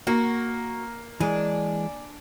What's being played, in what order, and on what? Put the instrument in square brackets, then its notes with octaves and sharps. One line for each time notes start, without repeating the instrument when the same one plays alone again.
[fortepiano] A#3 [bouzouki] F#4
[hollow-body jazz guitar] E3 G#3 [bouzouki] D4 G#5